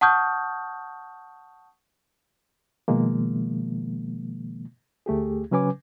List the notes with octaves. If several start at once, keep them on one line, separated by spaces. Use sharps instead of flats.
F#5 A5 C#6 D#6 F6 G6
B2 D#3 F3 G#3 A#3
D2 A3 G4 G#4
C#3 F#3 C#4 B4 G#5 D6